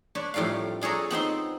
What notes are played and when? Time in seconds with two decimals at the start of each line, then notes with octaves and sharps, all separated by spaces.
0.15 D4 B4 C#5
0.34 F2 A2 G3 A#4 F5
0.81 D4 G#4 A4 C#5 A#5
1.11 B3 C4 D#4 C6